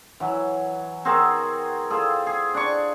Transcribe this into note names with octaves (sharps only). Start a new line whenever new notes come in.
E3 F#3
C4 F#4 G#4 A#4
F4 G#4 A4
G#4
D4 C#6